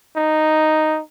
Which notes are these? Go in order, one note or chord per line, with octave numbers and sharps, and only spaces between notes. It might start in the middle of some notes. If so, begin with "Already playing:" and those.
D#4